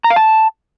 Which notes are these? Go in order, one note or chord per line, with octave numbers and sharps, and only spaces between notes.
A#5
F5
A5